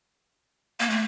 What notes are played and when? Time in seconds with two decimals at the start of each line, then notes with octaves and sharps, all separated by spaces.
0.80 A#3
0.90 A3